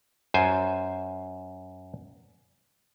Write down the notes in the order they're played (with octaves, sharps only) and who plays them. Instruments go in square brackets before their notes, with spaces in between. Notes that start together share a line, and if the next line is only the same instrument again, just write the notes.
[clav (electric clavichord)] F#2 C5 G#5